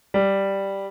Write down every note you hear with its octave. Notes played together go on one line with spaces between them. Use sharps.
G3